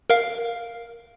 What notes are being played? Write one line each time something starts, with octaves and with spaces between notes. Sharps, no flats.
A#4 F5